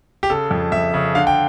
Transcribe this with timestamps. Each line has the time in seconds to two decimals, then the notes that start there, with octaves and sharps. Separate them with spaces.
0.23 G4
0.30 C#3 A4
0.51 F2
0.72 F2 E5
0.94 C#3
1.15 D3 F5
1.27 G5